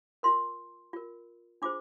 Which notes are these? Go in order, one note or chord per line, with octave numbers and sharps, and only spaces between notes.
F4 A#4 C6
F4 A#4
D4 F4 G#4 C5 D6